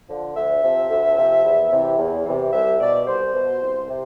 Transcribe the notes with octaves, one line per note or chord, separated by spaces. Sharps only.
D3 F3
D2 E5
C3 F3
D2
C3 F3
E2
C3 E3
E2
C3 E3
C2 E5
B2 D5
C2 C5
B2
C2
C3